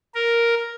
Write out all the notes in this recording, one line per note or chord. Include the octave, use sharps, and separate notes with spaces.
A#4